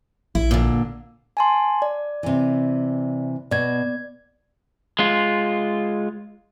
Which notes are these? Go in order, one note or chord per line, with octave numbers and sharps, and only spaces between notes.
A#1 E4
A#2 D3
G#5 A5 C6
D5
C3 E3
B2 D5 G#6
G#3 F4